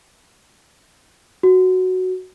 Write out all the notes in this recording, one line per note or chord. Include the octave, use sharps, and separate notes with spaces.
F#4